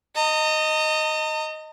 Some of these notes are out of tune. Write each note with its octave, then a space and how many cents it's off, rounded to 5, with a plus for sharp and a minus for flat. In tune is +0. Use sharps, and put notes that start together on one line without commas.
D#5 +0 A#5 -45